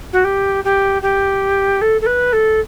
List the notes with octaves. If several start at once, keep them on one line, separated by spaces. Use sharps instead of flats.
F#4
G4
G4
G4
A4
A4
B4
A4